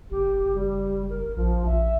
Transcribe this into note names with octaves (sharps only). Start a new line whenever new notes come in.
F#1 G4
F#1
G3
A#4
A#1 F3
A#1 E5